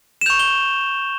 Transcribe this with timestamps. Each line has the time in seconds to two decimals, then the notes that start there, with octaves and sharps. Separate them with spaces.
0.21 E7
0.26 C#6 G6 F7
0.39 G7